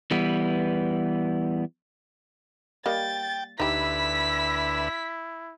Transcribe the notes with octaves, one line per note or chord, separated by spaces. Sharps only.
E3 G3 B3
G3 A#3 D#5 G5 A6
D2 D#4 E4 G4 B4 E5 B6